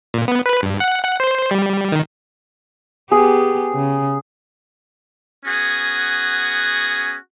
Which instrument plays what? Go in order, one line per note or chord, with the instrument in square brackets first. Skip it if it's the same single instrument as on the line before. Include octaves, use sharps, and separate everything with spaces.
[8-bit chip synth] A#2
B3
B4
G2
F#5
F#5
C5
G3
D#3
[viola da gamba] B3 G4 [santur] G#4
[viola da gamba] C#3
[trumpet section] B3 C#4 F#4 G#4